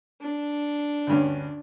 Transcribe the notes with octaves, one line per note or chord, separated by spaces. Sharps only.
D4
D2 G2 C#4